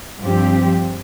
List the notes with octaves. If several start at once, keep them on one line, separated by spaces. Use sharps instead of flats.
G2 F3 C4 G4